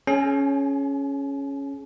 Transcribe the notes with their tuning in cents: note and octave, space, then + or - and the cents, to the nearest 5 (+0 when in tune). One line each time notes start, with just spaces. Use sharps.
C#4 +0 G#4 +25 G#5 +45